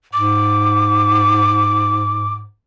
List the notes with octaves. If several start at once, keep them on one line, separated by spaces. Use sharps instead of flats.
G#2 D6